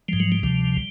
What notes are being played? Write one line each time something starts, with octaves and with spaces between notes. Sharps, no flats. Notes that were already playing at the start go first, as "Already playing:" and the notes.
G#2 F3 G3
F#3
G3
D2 C3 F3